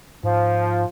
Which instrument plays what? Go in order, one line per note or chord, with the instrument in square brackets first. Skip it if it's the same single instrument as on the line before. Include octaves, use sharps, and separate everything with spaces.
[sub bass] G#2 [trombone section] F3